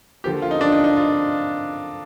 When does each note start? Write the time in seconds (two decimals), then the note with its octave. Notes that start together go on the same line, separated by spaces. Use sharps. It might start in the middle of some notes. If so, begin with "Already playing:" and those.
0.24 D3 F3 A#3 G4
0.42 F4
0.51 D#4
0.61 D4
0.72 D#4
0.84 D#4
0.96 F4